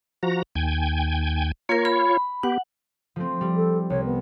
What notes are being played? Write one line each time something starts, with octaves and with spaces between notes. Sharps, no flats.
F3 F#4 A#5
D#2 G5 G#5
A#3 F4 A#4 C#5
B5
B3 G4 F#5
F3 A3 C4
G3
A4
C2 C#5
B3